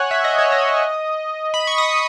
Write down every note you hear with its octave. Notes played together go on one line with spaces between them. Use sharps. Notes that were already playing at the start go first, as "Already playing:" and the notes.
Already playing: C#5 F#5 G#5
E5
D#5
C#5
D#5
B5
C#6
D#6